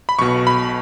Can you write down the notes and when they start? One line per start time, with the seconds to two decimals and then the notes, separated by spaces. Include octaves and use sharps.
0.09 B5
0.19 B1 B2 C#6
0.47 B5